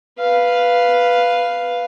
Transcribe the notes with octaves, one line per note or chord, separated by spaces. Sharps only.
B4 F5